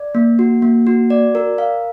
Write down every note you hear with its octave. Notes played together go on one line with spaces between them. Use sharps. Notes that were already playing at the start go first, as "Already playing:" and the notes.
Already playing: D5
A#3
F#4
A#3
F#4
D5
A#4
F5